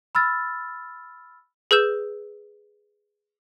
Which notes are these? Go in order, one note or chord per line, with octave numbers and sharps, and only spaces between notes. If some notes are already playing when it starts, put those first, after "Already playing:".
B5 E6 F6 A6
G#4 B4 E6 G6 E7